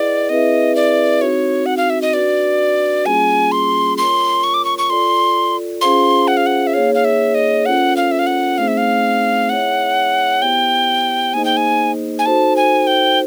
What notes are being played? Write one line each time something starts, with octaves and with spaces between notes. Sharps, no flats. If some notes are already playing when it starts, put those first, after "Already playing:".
Already playing: E4 G#4 B4 D5 D#5 F#5
C4 E4 G#4 B4 D#5 E5
D5
C4 D#4 F#4 C#5
F#5
F5
E5
D#5
D4 F#4 B4 D5
G3 A#3 C#4 F4 G#4 G#5
C6
F4 A#4 C#5 C6
C#6
D6
C#6
C#6
F4 A4 D5 C6
C#4 F4 G#4 C5 F5 C6
F#5
F5
F#5
E5
A#3 D#4 G#4 C#5 F5
F5
E5
D#5
C#4 F4 A4 C5 F#5
F5
E5
F5
F#5
A3 C4 D#4 G#4 C5 F5
E5
F5
E4 G#4 C#5 E5 F#5
B3 E4 G4 C5 G5
A#3 D#4 G#4 C5 D#5 G#5
G5
G#5
G#5
D#4 F#4 A4 C5 A5
G#5
G5